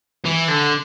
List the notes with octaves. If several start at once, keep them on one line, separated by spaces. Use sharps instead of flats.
E3
D3